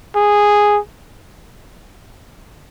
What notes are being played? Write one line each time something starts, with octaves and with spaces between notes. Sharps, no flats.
G#4